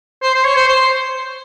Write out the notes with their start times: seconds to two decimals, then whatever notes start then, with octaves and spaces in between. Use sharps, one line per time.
0.22 C5
0.34 C5
0.44 C#5
0.56 C5
0.68 C5